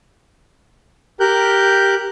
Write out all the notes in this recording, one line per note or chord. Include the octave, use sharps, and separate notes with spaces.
G4 A#4 F#6 G6